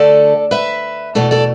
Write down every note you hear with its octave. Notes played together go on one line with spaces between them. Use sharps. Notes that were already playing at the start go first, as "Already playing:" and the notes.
Already playing: D2 D3 A3 A4 D5
B4 E5
E2 B2 A3 A4 D5
A4 D5